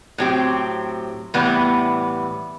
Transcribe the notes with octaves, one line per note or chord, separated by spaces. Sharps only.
A2 F#3 C4 G4
A2 E3 G3 B3